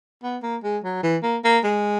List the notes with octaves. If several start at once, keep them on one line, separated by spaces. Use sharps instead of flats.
B3
A#3
G#3
F#3
E3
A#3
A#3
G#3